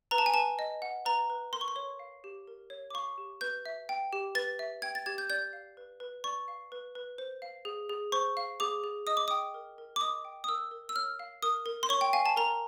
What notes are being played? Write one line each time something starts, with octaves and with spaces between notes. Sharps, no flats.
B4 A#5
A5
G#5
B4 A5
D#5
F#5
B4 A#5
B4
A#4 C6
C#6
C6
C#5
F5
G4
A#4
C#5
D6
F5 C#6
G4
B4 G6
E5
G5
G4
B4 A6
E5
G5 G#6
A6
G4 G#6
G6
D5 G6
F5
B4
B4
D5 C#6
F5
B4
B4
C5
F5
G#4
G#4
C5 C#6
F5
G#4 D6
G#4
D#5 D#6
D6
G5 D#6
A#4
A#4
D6
D#5 D#6
G5
D#6
A#4 E6
A#4
E6
C#5 F6
F5
A#4 D#6
A#4
C6
C#5 C#6
G5
F5 G#5
A5
A#4 A#5